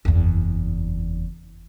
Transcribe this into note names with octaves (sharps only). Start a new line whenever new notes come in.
F#1 E2